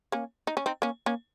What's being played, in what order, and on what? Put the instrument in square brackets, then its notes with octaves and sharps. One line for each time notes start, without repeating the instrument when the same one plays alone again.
[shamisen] A#3 C#4
D#4
C#4
C4 D#4
A#3 C#4
A#3 C#4